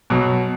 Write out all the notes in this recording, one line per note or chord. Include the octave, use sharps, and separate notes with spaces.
B2 F#3